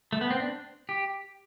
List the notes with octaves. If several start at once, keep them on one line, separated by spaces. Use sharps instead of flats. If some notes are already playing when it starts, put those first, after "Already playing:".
A3
B3
C4
D4
G4